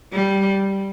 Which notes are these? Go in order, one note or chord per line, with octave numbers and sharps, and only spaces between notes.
G3